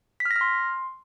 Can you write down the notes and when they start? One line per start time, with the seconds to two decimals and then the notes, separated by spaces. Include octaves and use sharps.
0.20 B6
0.25 F6
0.31 A#6
0.36 F6
0.41 C6